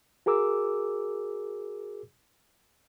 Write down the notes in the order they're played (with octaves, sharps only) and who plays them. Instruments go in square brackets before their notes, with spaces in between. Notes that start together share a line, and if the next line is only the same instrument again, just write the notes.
[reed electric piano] F#4 G#4 A#4 D6 E6